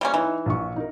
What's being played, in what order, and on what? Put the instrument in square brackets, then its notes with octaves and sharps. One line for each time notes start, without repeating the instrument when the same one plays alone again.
[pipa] G3 A#3 C#4
[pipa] E3 [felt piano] D#4
[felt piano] A#1 C#6
D#4 A#4